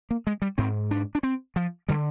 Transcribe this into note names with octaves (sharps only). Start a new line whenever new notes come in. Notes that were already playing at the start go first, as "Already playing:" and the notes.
A#3
G#3
G3
G#2 C4
D4
D4
C4
F3
D3 G3